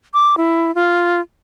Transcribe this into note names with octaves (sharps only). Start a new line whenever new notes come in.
D6
E4
F4